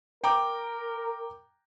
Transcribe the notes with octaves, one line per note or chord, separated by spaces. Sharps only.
A#4 G5 A#5 D6